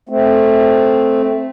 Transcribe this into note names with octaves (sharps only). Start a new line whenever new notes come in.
A3 C4